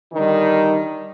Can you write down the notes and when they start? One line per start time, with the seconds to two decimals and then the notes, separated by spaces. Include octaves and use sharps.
0.13 D3 D#3 G3 D#4